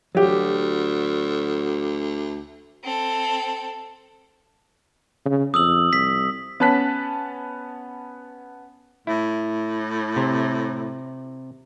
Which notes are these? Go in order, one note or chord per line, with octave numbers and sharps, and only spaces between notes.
D2 F#3 G4
C4 A4
C#3
F2 D#6 E6 F#7
C2 B6
B3 C#4 A5 F#6 B6
A2 E4
C3